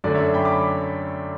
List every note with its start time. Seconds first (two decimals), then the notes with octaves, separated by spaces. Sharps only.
0.04 F#2 D3 A3 D4 D5
0.14 C#5 E5
0.34 G5 B5
0.45 B5 D6